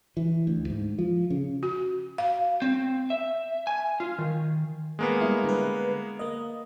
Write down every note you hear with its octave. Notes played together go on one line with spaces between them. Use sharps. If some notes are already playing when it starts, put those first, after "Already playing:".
E3
D2
G#2
F3
C#3
F#4
F5
C4
E5
G#5
F4
D#3
G#3 A#3 B3
G3 E4
D3 B4
A#3 D#5